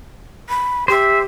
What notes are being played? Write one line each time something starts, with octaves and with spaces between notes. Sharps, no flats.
B5
G4 C5 E5